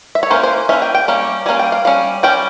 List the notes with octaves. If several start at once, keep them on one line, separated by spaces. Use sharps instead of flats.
E5
C#5
E3 A#3 C#4 C5
C5
E3 A#3 C#4 E5
G5
G5
G3 A#3 C#4
G3 A#3 C#4 G#5
G5
F5
G3 C#4 F5
G3 C#4 G5